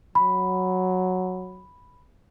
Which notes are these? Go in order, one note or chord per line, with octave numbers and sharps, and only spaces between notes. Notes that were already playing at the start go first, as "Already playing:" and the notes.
F#3 B5